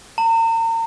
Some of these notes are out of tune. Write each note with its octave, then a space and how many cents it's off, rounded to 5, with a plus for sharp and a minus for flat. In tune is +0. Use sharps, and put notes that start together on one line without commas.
A#5 -40